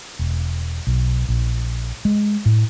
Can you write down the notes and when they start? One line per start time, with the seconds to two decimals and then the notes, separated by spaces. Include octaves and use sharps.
0.19 E1
0.87 B1
1.29 A#1
2.05 G#3
2.46 A2